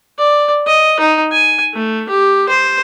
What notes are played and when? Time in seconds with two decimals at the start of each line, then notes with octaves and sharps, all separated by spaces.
0.18 D5
0.67 D#5
1.00 D#4
1.32 G#5
1.74 A3
2.09 G4
2.49 C5